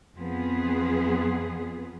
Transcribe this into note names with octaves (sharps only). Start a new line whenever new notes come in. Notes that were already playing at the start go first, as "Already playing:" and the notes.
F2 F3 B3 G#4